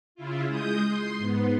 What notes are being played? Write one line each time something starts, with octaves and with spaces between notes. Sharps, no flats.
C#3 E4 F4
G#3 D#6 G6
C6
G#2 B3